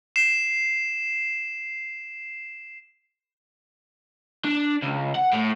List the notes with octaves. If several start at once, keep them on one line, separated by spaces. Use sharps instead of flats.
C7 E7
D4
C#2
F#5
A2